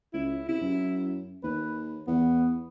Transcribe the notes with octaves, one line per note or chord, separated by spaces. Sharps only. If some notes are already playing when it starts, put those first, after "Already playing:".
C#2 E4
C3 E4
F#2
D#2 B4
E2 B3